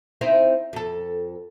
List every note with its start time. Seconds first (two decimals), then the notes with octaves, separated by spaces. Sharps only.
0.21 C4 D#4 E4
0.73 F2 A4